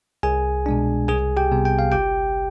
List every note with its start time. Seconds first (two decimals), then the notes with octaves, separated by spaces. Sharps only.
0.23 C2 G#4 G#5
0.66 B2 G#3 D4
1.08 C2 G#4 G#5
1.37 G4 G5
1.52 C3 G3 B3
1.65 G5
1.79 F5
1.92 G1 G4 G5